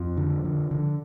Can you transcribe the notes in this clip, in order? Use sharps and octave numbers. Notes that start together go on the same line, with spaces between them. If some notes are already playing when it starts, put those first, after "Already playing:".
Already playing: F2 F3
D3
D3
D3